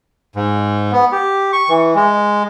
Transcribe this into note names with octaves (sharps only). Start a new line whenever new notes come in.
G#2
B3
G4
C#6
E3
G#3